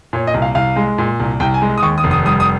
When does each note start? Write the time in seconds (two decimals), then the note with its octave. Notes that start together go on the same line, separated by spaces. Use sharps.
0.13 A#2 C#5
0.27 D#5
0.34 C2
0.42 F5
0.55 C2 F5
0.76 G#3
0.98 A#2
1.20 C2
1.40 C2 G5
1.54 G#5
1.62 G#3
1.78 D#6
1.82 D#2 C#6
1.98 D#6
2.04 F1
2.11 D#6
2.25 G3 D#6
2.40 D#6